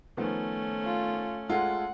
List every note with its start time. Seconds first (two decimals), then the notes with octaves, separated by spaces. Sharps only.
0.17 D#3 F3 A3 B3 C#4
0.84 F4
1.49 G#3 F4 A4 F#5